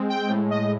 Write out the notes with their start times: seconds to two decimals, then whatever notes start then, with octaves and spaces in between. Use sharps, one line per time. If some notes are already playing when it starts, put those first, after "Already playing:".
Already playing: G#3 C4
0.09 G5
0.29 A2
0.50 D#5